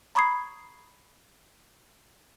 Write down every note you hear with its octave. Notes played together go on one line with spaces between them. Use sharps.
A#5 B5 C#6 D#6 G#6 C7